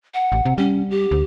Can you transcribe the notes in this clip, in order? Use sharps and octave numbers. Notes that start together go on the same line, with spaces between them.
F#5
A1
C3
G3 C#4
G4
D2